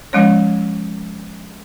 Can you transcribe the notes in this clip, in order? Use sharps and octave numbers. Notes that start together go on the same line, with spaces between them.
F3 G#3 C#4 C#5